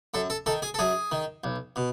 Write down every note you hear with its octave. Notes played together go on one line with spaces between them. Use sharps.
F#2 A4
A4
D#3 A4
G#4
A4
F#2 G#4
D#3
B1
B2